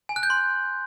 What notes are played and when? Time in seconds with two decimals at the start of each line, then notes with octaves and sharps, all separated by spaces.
0.09 G#5
0.16 F#6
0.23 G6
0.30 C6